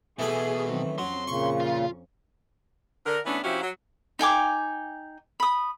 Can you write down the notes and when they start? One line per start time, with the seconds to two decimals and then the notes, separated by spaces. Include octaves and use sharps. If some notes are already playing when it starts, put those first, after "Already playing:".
0.19 B2 E3 A3 G#4 B5
0.66 D#3 F#3 C4
0.98 F2 F#3 C#4 C6
1.27 A#2 C#3 C#6
1.60 F4
3.06 D3 A#4
3.26 E3 A3 B3 C#4 D4
3.43 C3 F3 C#4 E4 F#4
3.61 F#3
4.19 D#4 G5 G#5 D6
5.40 B5 D#6